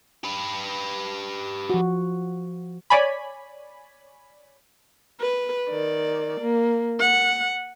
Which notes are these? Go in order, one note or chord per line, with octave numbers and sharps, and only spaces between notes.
G4 B4
F3 F#4
C#5 D5 G#5 B5
B4
D#3 D5
A#3
F#5